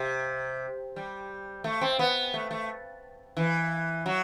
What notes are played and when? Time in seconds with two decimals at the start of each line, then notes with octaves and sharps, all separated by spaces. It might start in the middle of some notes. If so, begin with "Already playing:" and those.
Already playing: C3
0.96 G3
1.64 A3
1.81 C4
1.99 B3
2.34 A3
2.51 A3
3.37 E3
4.06 F#3